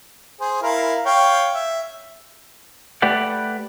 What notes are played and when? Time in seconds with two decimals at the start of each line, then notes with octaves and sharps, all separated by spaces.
0.40 G#4 C5
0.63 E4 A#4 F5
1.06 C#5 F5 G5
1.55 E5
3.02 A3 G4 B4 D5 F#5